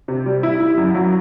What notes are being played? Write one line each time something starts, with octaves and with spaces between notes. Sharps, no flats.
C3
G3
E4
E4
F#2
F#3